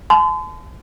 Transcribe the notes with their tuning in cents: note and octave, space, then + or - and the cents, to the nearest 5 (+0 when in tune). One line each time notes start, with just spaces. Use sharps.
A5 -45 C6 -40